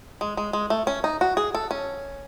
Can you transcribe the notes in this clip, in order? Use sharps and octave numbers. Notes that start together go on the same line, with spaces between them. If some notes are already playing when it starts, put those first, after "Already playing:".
G#3
G#3
G#3
A3
C#4
D#4
F#4
G#4
A4
C#4